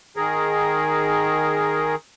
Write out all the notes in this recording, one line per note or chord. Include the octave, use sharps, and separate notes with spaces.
D#3 G#4 A#4